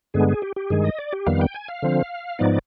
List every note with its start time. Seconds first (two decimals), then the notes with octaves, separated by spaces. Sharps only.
0.14 G2 D3 G#3 B3 G#4
0.28 G#4
0.42 G4
0.56 G4
0.70 G2 D#3 G#3 G#4
0.84 D#5
0.99 D5
1.13 G4
1.27 F2 D#3 G3 B3 F5
1.41 G5
1.54 G#5
1.68 F5
1.82 D3 F3 C4
2.39 G#2 F3 B3 D#4 D5